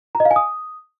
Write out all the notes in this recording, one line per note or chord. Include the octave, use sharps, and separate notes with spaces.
A#5
D#5
F5
G#5
D#6